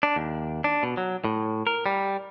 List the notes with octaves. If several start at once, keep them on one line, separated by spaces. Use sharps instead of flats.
D4
D#2
D4
B2
F#3
A2
A#4
G3